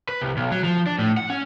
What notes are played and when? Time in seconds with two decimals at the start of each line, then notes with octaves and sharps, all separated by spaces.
0.09 B4
0.21 C2
0.37 B1
0.52 F#3
0.64 F3
0.87 D4
0.99 A2
1.17 F#5
1.30 C#4